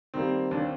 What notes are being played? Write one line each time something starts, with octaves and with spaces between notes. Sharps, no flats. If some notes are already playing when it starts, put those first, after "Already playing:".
D#3 G3 A#3 C4
D#2 D4
C4